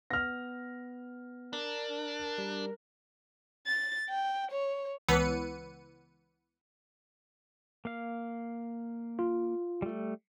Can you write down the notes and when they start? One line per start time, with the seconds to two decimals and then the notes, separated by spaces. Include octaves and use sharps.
0.10 B3 F6 A#6
1.53 D4 A#4
2.38 G3
3.67 A6
4.09 G5
4.51 C#5
5.08 C#2 E3 B3 B4 C#7 D#7
7.85 A#3 F5
9.19 F4
9.82 G3 A3